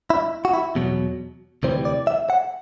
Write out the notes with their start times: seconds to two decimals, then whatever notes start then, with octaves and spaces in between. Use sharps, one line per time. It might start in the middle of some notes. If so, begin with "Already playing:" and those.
0.10 E4
0.45 F#4
0.54 E4
0.75 E2 B2 F#3
1.63 D2 C3 E3 G3 C5
1.85 D5
2.07 E5
2.30 F#5